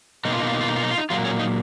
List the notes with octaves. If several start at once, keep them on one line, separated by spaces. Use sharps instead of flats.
B2 A#3 D#4
F4
D#4
F4
D#4
F4
D#4
F4
D#4
F4
D#4
A#2 F#3 A#3 F4
C#4
D#4